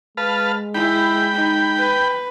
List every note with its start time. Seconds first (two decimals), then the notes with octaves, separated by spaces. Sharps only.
0.17 G#3 B4 F5 A5
0.75 E4 G#4 G5 B5
1.33 D#4
1.77 B4